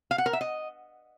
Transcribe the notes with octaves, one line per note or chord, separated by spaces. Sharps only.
F5
F#5
A#4
E5
D#5